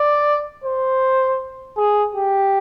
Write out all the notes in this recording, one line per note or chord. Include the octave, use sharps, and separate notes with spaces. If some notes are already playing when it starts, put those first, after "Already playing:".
Already playing: D5
C5
G#4
G4